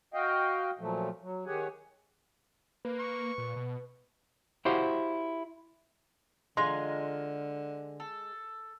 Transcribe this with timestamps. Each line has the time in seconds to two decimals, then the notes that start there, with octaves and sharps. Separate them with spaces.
0.14 F#4 D#5 F5 G5
0.79 A#2 F3 F#3 A3
1.22 F#3
1.46 D#3 G4 G#4 C#5 F#5 G#5
2.85 A#3 B4
2.99 C#6
3.38 A#2
3.56 B2
4.65 E4 F#4 G4 C5 F5 F#5
6.57 D3 G#3 F4 G#5 A#5 C6
8.00 A4